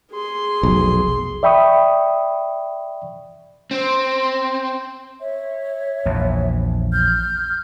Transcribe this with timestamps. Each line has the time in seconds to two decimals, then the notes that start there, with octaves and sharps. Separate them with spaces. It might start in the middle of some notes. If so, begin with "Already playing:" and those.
0.12 G#4 C6
0.63 F1 B1
1.43 D5 E5 G5 B5 C#6 D#6
3.71 C4
5.20 C#5 E5
6.06 A#1 E2
6.92 F6 G6